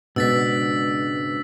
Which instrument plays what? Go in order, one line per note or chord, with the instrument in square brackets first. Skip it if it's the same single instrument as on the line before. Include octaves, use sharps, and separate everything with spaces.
[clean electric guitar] C#2 G#2 [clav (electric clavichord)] B2 [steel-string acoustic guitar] D4 [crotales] E6 A6 B6